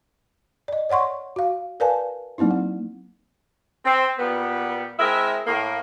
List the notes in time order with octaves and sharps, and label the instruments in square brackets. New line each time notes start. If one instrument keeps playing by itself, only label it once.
[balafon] D5 D#5
C#5 D5 F#5 C6 C#6
F#4 F5
A#4 B4 D5 F5 G#5 A5
F#3 A#3 C4 D#4 E4
A#3
[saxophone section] C4
A#2 G3 B3
G#3 C4 E4 A#4 E5
A2 A#3